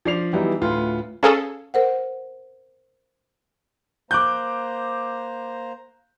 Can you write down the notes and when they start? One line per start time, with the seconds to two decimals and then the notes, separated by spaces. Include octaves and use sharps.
0.05 F3 D4 D5 C7 F7
0.33 E3 F#3 G3 B3 D#4 E4
0.61 D2 A2 F4 B4 C6
1.23 C#4 G#4 A4 F5
1.74 A#4 C5 F#5
4.11 A#3 C5 A#5 D6 F#6 G6